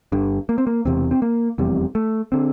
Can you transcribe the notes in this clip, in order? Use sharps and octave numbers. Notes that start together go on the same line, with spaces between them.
G1 G2 D3
A#3
C4
A#3
E1 E2 C3 C4
C4
A#3
F1 E2 C3 G3
A3
D3 C4